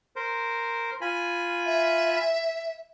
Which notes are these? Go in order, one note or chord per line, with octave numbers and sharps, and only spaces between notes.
A#4 C5
F4 G#5 B5
E5